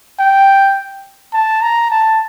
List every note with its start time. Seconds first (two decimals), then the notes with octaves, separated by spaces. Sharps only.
0.19 G5
1.33 A5
1.62 A#5
1.91 A5